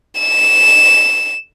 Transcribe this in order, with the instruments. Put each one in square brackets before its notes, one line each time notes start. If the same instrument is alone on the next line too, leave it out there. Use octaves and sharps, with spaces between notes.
[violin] E7